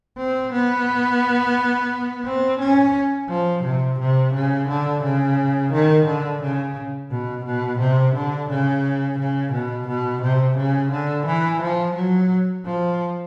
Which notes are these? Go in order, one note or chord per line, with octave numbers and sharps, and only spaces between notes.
C4
B3
C4
C#4
F3
C3
C3
C#3
D3
C#3
D#3
D3
C#3
B2
B2
C3
D3
C#3
C#3
B2
B2
C3
C#3
D3
E3
F3
F#3
F3